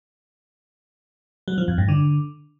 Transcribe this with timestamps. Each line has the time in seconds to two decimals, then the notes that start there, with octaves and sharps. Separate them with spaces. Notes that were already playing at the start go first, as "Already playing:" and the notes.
1.48 F#3
1.58 F3
1.68 F2
1.78 G2
1.88 D3